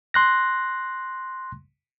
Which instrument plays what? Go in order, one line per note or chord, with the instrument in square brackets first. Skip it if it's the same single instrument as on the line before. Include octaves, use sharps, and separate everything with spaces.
[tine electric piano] C6 F#6 A#6